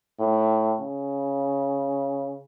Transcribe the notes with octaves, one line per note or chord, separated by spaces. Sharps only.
A2
C#3